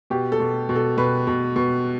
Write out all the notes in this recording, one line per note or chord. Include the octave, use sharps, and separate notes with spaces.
B2 G4
A4
B2
B2
A4
B2 B4
B2
B2